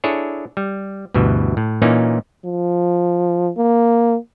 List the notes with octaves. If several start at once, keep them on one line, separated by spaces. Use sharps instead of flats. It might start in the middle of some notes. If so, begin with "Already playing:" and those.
D4 E4 G#4 A4 C#5
G3
D2 G2 B2 E3
A2
A#2 E3 A#3 C#4 D#4
F3
A#3